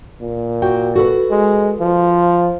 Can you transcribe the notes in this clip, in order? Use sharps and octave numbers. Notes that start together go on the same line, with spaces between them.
A#2
F#4 G5
F#4 A4 B4
G#3
F3